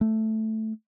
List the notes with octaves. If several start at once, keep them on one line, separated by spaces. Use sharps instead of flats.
A3